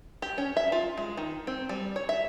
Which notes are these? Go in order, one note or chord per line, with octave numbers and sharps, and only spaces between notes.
G4
C#4
E5
F4
G#3
D#3
C4
G3
C#5
E5